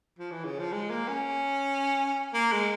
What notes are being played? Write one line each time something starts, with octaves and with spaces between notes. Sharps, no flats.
F3
E3
C#3
F3
G#3
A#3
C#4
A#3
G#3